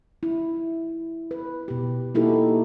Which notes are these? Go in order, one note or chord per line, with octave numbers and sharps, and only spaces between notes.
E4
B4
B2 G4
A#3 D#4 E4 F#4 G4 A4